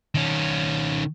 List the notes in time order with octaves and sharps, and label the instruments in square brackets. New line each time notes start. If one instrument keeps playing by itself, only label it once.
[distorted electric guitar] D#3 C#4